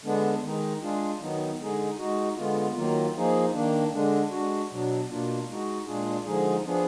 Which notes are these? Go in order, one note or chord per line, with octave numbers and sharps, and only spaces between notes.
D3 G#3 B3 D4
D#3 G#3 D#4
G#3 D4 F4 G#4
D#3 F#3 B3 D#4
D3 G#3 D#4 G#4
G#3 D#4 F#4
D3 G#3 B3 F4
D#3 F#3 A#3 F4
F3 A#3 D#4 G#4
D#3 A#3 D4
D3 G#3 D4
G#3 D4 F#4
B2 F#3 D4
B2 A#3 D4 F4
G#3 D#4 F#4
A#2 G#3 D4 F4 G#4
D3 F3 G#3 D#4 G#4
F3 B3 D4 G#4